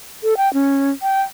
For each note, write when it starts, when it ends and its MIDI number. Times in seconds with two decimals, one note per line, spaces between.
0.23 0.37 69
0.37 0.52 79
0.54 0.91 61
1.02 1.22 79